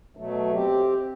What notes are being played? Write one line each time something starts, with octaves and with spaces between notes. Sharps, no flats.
B2 F#3 A3
C4 G4